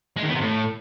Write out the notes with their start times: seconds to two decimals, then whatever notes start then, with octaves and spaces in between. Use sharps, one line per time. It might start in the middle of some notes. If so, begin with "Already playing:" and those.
0.17 G#3
0.23 D#3
0.29 B3
0.35 C3
0.41 A2